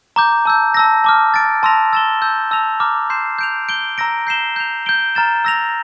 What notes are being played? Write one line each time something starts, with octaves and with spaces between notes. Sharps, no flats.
A#5 D6 G6
A5 E6 G6
A5 E6 A#6
A5 D6 F6
F6 A6 D7
A5 C6 E6 A#6 F7
E6 A6 E7 G7
A5 E6 G6
A5 E6 A#6 F7
A#5 D6 F6
C6 G6 C7 E7
G6 D7 F7
G6 D7 G7
A#5 E6 A#6 D7
G6 C7 E7 G7
G6 C7 F7
G6 D7 G7
A#5 F6 A6 E7
E6 A#6 F7